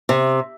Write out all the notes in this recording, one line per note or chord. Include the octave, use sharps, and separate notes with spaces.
C3